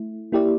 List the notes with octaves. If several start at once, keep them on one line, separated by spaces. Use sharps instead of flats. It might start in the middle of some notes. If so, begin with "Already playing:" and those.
Already playing: A3 E4
A#3 E4 G4 D5